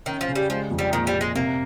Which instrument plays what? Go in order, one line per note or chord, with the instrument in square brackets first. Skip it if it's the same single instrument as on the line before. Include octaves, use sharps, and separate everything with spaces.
[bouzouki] D#3 [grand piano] C#4
[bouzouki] F3
[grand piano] C#3
[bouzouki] G3
[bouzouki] F3 [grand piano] G#3
[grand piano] F2
[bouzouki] G3
[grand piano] A#2 [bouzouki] D#3
[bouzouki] G3
[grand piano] A#2
[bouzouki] G#3
[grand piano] C3 [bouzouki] A#3